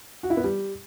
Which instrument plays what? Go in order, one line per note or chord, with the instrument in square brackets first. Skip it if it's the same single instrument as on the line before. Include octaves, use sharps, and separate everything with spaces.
[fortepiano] F#4
E4
B3
G3